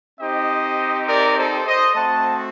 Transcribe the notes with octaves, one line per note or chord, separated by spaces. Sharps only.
C4 D#4 G4 C5 D#5
A#4 D5
A4 C5
C5 D#5
A3 C4 F#4 F#5 A5